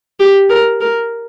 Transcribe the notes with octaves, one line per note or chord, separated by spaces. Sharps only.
G4
A#4
A#4